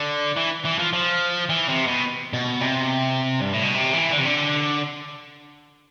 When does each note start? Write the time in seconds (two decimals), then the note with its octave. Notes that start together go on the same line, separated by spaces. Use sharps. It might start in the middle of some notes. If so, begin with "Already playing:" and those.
Already playing: D3
0.37 E3
0.65 E3
0.79 F3
0.93 F3
1.49 E3
1.68 C3
1.87 B2
2.33 B2
2.61 C3
3.41 G2
3.53 A2
3.63 B2
3.74 C3
3.94 E3
4.12 D3
4.19 C3
4.26 D3